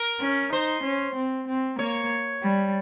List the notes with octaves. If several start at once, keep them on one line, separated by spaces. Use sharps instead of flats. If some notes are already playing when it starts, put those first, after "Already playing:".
Already playing: A#4
C#4
D#4 C5
C#4
C4
C4
A#3 C#5
G3